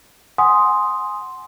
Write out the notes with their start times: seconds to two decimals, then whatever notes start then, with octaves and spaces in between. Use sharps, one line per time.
0.38 F#5 G#5 C6 D#6